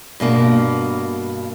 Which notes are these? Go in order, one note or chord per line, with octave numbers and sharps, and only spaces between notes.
G2 B2 A#3